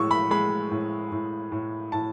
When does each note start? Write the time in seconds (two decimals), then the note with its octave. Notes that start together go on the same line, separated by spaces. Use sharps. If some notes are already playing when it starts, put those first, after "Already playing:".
Already playing: A2 G#3 C#6 E6
0.11 B5
0.31 G#3 B5
0.71 A2
1.12 A2
1.52 A2
1.92 A2 A5